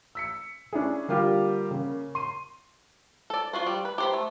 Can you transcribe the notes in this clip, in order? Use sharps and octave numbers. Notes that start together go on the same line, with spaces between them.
E6 B6 C#7
C#4 D4 E4 G#4
D3 G3 A#3 F4 G4
C#3 A#3
C6 D#7
A4 D5
D4 F4 F#4 C5
G3
B4
G4 C5 B5
A3